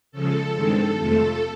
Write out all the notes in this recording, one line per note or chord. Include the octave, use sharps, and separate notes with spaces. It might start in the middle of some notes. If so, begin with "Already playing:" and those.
C#3 F3 G#3 A4
G2 D#3 G#3 C4
F2 C3 F3 A3 A4